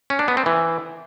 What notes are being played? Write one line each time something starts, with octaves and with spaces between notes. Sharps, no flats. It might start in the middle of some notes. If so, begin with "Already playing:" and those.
C#4
D4
B3
C4
E3